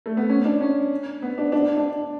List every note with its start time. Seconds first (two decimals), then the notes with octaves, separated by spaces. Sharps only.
0.06 A3
0.17 B3
0.29 C#4
0.45 D4
0.61 C#4
1.22 B3
1.38 D4
1.52 D4
1.77 D4